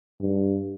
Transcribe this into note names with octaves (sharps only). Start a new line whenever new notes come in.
G2